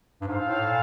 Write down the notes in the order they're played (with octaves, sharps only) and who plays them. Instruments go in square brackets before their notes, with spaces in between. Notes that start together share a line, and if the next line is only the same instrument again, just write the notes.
[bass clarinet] G2
[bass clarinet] G#2 [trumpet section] F4 A4 C5 F5
[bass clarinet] A2
A#2